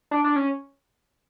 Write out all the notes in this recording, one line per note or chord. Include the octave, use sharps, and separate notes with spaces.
D4
D4
C#4